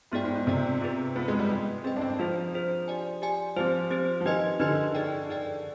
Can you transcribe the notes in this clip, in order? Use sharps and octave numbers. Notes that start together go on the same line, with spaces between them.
G#2 B3 F4 G#4 D5 G5
G#2
G#2
C3 B3 F4 G#4 D5 G5
C4 F4 G#4 B4
B3 C4 F4 G#4 B4
G#3
G3
G#3 G#4 B4 D#5 G5
C4 G#4 B4 D#5 G5
D4
C4
F3 D4 F4 G#4 C5
D4 F4 G#4 C5
G4 D5 G#5
G4 D5 G#5
F3 C4 G4 C5
C4 G4 C5
F3
D#3 D#4 G4 B4 D#5 G#5
D3 D#4 G4 B4 D#5 G#5
D#4 G#4 D5 G5
D#4 G#4 D5 G5